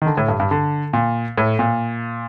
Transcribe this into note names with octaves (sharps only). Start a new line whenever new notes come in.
D#3
D3
A2
G2
G2
D3
A#2
A2
A#2